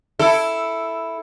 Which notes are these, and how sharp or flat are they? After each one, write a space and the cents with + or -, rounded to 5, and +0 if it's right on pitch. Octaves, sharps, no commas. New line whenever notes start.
E4 +0 A4 +5